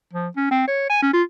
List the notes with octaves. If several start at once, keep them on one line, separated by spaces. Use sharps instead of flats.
F3
C#4
C4
C#5
G#5
C#4
F4